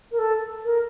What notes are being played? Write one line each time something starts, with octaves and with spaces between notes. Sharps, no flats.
A#4
A4
A#4